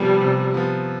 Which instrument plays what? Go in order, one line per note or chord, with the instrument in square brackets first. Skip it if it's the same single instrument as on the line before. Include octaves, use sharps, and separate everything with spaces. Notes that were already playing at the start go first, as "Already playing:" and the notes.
Already playing: [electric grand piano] C3 F3 B3 [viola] G3
[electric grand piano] C3
F3 B3